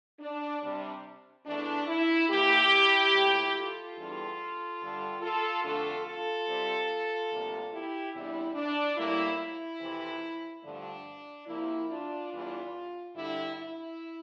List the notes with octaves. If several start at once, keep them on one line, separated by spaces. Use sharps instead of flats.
D4
C3 G3 D4
E2 E3 A3 D4
E4
F2 E3 A#3 E4 G4
A2 F3 A#3
F4 A4
E2 E3 G3 D4
G2 D3 G3 D4
F4 A4
F2 D3 A3 D4 F4 A4
F4 A4
C3 G3 C4
D2 C3 G3 A#3 D4
E4 G4
E2 C3 G3 D4 E4
D4
A2 G3 A#3 E4
E4
F2 C3 E3
G2 D3 F3 A3 D4
C3 F3 A#3 E4
D4 F4
E2 E3 G3 D4
G2 D3 G3 D4 E4
E4